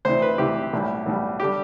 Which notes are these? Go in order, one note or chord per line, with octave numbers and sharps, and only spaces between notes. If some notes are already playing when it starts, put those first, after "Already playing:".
D2 C3 E3 C5
B4
D2 C3 E3 G4
B1 A2 G3
B1 A2 G3
D3 G3 G4